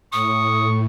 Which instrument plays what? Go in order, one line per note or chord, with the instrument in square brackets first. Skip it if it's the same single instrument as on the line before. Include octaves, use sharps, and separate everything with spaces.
[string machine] A2 [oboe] C#6 [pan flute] D#6